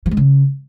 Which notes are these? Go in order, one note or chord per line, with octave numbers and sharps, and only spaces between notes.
F3
G#3
C#3